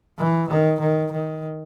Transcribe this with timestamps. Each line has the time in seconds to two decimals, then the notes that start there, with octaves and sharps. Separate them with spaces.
0.18 E3
0.49 D#3
0.80 D#3
1.12 D#3